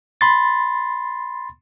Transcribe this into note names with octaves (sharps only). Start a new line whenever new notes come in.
B5 C6 A6